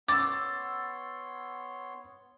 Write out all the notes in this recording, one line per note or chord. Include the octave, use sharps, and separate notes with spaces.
B3 C#5 C6 D6 E6 A6